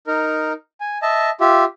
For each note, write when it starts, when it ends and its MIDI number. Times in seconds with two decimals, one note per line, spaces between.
0.07 0.53 63
0.07 0.53 70
0.80 0.98 80
1.02 1.30 75
1.02 1.30 76
1.02 1.30 81
1.41 1.64 65
1.41 1.64 67
1.41 1.64 76